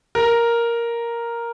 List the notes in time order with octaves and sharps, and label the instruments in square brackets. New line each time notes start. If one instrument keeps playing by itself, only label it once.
[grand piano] A#4